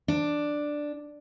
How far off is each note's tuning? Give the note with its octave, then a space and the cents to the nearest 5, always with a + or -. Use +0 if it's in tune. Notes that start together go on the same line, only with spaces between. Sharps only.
D4 +5